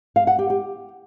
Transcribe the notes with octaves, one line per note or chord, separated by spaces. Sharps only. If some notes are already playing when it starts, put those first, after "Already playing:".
F5
F#5
G4
G4